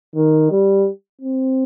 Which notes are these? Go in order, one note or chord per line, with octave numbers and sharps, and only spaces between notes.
D#3
G3
C4